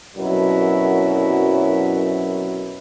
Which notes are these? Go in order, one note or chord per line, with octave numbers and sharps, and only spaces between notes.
C2 F#2 B2 F#3 E4